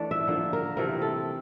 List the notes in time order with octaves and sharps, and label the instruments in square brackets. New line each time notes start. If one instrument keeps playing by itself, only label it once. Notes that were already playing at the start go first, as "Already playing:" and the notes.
Already playing: [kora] E3 A3 D4 D5
E5
D3 F3 A#3
A#4
C3 E3 A3 C4 A#4
A4